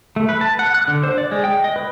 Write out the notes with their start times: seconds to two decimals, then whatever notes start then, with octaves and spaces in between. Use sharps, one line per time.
0.16 A3
0.29 B4
0.41 A5
0.59 F#5
0.75 F#6
0.88 D3
1.04 C5
1.18 D5
1.31 G#3
1.44 G5
1.64 D#5
1.76 B4